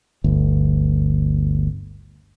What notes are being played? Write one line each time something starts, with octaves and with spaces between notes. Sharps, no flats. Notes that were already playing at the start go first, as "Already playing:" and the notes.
G1 D2